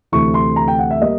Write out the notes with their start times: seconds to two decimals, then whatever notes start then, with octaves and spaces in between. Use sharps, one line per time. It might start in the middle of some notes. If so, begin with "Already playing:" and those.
0.12 D2 C3 E3 A3 C#6
0.34 C6
0.56 A#5
0.68 G5
0.79 F#5
0.91 E5
1.01 G3 A#3 D#5